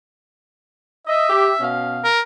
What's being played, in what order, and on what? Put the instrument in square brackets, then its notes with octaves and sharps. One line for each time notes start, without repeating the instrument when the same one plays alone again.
[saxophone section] D#5 [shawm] E5
[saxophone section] G4
B2 C#4 F5
[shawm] A#4